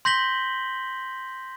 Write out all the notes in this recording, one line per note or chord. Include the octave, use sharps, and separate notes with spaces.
C6 G6 A#6 B6 F#7 G7